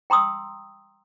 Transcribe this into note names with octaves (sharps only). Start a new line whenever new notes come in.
G5 A#5 C6 D#6 E6